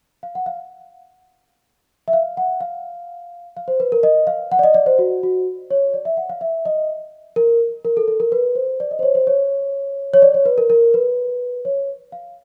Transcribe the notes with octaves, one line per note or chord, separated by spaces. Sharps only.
F5
F#5
F5
E5
F5
F#5
F5
F5
C5
B4
A#4
D#5
F5
F#5
D5
D#5
D5
C5
F#4
F#4
C#5
D5
E5
F#5
F5
E5
D#5
A#4
A#4
A4
A4
A#4
B4
C5
D5
D#5
C5
C#5
C5
C#5
C#5
D5
C#5
B4
A#4
A#4
B4
C#5
F5